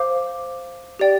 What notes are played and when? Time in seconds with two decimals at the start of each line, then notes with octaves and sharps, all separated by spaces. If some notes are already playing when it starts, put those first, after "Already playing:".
Already playing: C5 F5 D6
0.99 G4 D5 G5